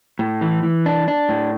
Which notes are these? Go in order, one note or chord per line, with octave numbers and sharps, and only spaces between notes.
A2
E3
E3
D4
D4
A2